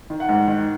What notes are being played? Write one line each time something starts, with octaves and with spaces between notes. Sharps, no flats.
D#3
F#5
G#2
D#3